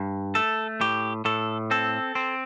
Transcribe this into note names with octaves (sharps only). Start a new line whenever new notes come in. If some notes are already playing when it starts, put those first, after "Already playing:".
Already playing: G2
A3 A4
A2 G4
A2 A4
C4 A4
C4